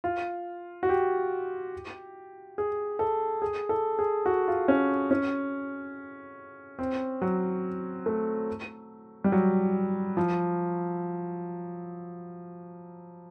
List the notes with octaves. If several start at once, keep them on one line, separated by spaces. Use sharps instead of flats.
F4
F#4
G4
G#4
A4
G#4
A4
G#4
F#4
F4
C#4
C#4
C4
F#3
A3
G3
F#3
F3